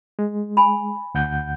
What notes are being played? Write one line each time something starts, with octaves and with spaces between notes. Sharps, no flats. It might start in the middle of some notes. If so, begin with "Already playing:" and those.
G#3
G#5 B5
D2 F#5 G6